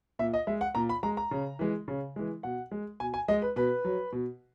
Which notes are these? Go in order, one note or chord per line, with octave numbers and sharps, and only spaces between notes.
A#2 E5
D#5
G#3 E5
F#5
A#2 A#5
B5
G#3 A#5
A#5
C#3
E3 G#3
C#3
E3 G#3
B2 F#5
G#3
B2 G#5
G#5
G#3 D#5
B4
B2 B4
F#3
B2